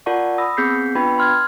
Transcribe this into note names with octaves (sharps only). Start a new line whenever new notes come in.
F4 A#4 D5 F#5 A5 C#6
B5 D#6 E6 A#6
B3 C4 G#4 G6 B6 C7
B3 D4 F4 B4 G5 B5
C6 F6 G#6